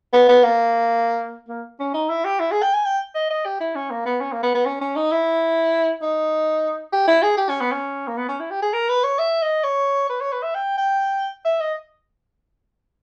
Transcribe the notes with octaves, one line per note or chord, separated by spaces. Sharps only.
B3
B3
A#3
A#3
C#4
D#4
E4
G4
E4
G#4
G5
G#5
G5
D#5
D#5
G4
E4
C#4
A#3
B3
C#4
A#3
B3
B3
C#4
C#4
D#4
E4
D#4
G4
E4
G#4
G4
C#4
B3
C#4
A#3
B3
C#4
E4
G4
G#4
A#4
B4
C#5
E5
D#5
C#5
B4
C#5
B4
E5
G5
G5
E5
D#5